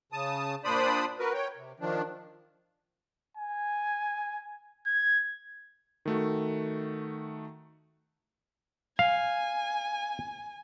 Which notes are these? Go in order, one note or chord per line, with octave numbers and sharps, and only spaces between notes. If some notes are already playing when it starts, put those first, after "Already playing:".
C#3 A5 D#6
A#2 D4 C5 D5 B5 D#6
F#4 A#4 B4
C#5 G5
C3
D#3 F3 D4
G#5
G#6
D#3 A3 F#4
F5 G#5